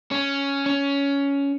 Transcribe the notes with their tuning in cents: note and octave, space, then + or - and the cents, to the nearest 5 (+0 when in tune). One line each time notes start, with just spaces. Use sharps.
C#4 +5
C#4 +15